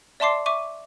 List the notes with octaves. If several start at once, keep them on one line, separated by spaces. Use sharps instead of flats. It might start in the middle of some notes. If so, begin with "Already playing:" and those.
D5 E5 A5 C6 D6 C7
E5 C#6 D6 D#7